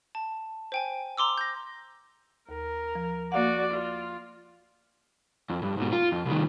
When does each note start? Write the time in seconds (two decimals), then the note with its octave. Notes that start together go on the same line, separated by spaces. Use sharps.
0.15 A5
0.72 C5 G5 G#5
1.17 A#5 C6 D6 E6
1.38 G6 A#6
2.49 D#2 A#4
2.95 F3
3.32 A#3 F#4 D5 F5 F#5
3.74 F4
5.50 F2
5.63 G2
5.77 G#2 B2
5.92 F4
6.12 F2
6.26 C2 D#3